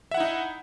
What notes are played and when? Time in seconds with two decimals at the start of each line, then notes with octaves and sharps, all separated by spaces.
0.11 E5
0.14 F#5
0.17 E4
0.20 D#4